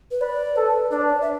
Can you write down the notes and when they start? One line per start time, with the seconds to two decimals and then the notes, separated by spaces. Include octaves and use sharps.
0.11 B4
0.21 B4 D5
0.56 A4 B4
0.91 D4 D5
1.01 B4
1.10 D5
1.21 E5